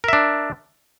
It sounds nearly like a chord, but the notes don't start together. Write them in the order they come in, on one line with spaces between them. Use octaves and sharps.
A#4 E5 D4